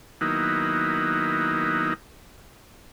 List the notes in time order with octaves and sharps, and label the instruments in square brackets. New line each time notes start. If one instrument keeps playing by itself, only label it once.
[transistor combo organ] D#3 F#3 A#3 B3 D#4 E4